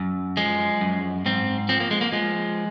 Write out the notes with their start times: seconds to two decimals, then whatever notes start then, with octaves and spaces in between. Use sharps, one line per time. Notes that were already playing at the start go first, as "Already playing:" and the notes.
Already playing: F#2
0.37 F3 G#3
0.81 F#2
1.25 G#2 C4
1.69 F3 C4
1.80 A#3
1.91 G#3
2.01 A#3
2.12 F3 G#3